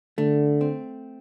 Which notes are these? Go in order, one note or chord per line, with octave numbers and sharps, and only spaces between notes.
D3 A3
C4